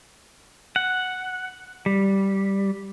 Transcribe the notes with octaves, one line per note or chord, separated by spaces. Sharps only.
F#5
G3